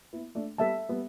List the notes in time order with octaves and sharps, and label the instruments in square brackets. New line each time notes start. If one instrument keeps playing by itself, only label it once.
[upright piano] B3 E4
A3 D4
[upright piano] G3 B3 [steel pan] A4 E5 A5
[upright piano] G3 B3